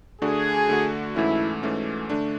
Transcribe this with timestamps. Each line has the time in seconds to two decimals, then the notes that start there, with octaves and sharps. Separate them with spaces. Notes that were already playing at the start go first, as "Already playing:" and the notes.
0.22 D3 A3 D4 F#4 G#4
0.69 D3 A3 D4 F#4
1.16 G#2 E3 A3 C#4 E4
1.63 G#2 E3 A3 C#4
2.09 D3 A3 D4